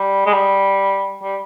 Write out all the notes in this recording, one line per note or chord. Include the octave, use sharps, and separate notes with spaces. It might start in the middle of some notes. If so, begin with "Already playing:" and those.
Already playing: G3
G#3
G3
G3